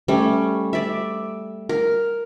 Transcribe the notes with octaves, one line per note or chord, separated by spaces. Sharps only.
G3 A3 C#4
D5 E5
A#4